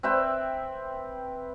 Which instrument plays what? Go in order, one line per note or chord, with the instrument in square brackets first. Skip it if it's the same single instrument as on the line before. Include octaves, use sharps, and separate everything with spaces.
[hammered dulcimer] C4 B4 E5 G5